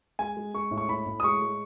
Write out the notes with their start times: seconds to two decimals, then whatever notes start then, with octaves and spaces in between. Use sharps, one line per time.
0.19 G#3 G#5
0.37 G#3
0.54 G#3 C#6
0.71 A2
0.78 C#6
0.88 A2 B5
1.06 A2
1.20 D#6
1.24 G#3 C#6
1.42 G#3